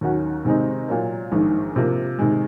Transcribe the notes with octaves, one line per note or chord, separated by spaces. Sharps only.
D#2 D#3 F#3 C#4 F#4
C3 D#3 G#3 C4 D#4
A#2 F#3 A#3
A#1 G#2 D#3
C3 F3 A#3
C3 D#3 G#3